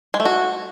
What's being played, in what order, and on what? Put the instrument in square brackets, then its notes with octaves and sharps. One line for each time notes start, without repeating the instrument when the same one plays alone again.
[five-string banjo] G#3
A3
F#4